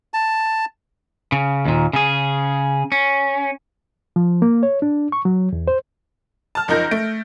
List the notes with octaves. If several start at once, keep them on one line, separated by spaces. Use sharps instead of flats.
A5
C#3
D#2 A#2
C#3 G#4
C#4
F3
A#3
C#5
D4
C#6
F#3
E2
C5
A5 F6
F#1 F3 D#4 A#4 G6 A#6
A3 D7